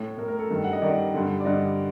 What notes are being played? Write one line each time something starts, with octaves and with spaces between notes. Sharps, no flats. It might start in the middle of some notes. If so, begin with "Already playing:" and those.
Already playing: A2 A4
A2 A#4
A#4
A4
G2 D#3
F#5
D#5
G2 D#3 D5
G2 D3
D5
G2 D3 D#5